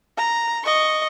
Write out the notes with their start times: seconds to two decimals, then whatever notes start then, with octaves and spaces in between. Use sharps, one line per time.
0.17 A#5
0.65 D#5 C#6